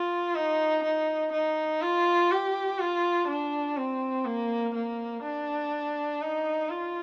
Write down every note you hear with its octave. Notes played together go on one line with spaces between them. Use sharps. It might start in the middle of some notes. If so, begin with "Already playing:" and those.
Already playing: F4
D#4
D#4
D#4
F4
G4
F4
D4
C4
A#3
A#3
D4
D#4
F4